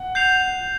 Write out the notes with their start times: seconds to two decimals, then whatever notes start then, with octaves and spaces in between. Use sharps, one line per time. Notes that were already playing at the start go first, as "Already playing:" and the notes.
Already playing: F#5
0.15 G6 C7 F7